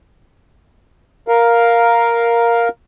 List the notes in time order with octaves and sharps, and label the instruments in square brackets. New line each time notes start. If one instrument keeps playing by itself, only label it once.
[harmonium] A#4 F5